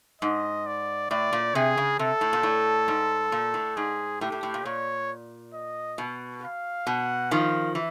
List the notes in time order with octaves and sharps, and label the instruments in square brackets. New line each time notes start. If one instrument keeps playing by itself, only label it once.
[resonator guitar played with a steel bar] G#2 [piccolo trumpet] D#5
[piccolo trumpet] D5
[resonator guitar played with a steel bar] A2 [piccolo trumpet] D5
[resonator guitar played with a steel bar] A#2
[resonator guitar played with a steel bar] C3 [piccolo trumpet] G#4
[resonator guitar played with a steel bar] C#3
[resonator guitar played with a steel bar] C3 [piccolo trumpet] A4
[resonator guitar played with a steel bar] A2
A#2
A2
G#2
A#2
A2
[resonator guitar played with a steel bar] G#2 [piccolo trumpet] G#4
[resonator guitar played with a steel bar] A2 [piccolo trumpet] G4
[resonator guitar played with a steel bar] A2
A2
A#2
[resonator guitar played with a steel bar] A#2 [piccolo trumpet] C#5
[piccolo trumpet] D#5
[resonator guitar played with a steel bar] B2
[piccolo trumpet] F5
[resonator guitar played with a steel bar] B2 [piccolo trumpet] F#5
[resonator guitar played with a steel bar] D#3 F3 [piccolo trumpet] F5
[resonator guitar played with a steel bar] E3